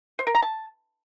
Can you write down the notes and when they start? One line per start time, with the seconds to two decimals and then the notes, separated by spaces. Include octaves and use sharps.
0.19 C5
0.27 A#4
0.35 A#5
0.42 A5